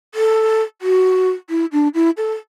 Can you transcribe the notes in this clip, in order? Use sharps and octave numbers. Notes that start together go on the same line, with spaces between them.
A4
F#4
E4
D4
E4
A4